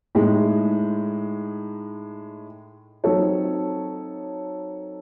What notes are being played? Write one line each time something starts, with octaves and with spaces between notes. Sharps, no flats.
A2 G#3 D#4
F#3 C4 D#4 A4 C#5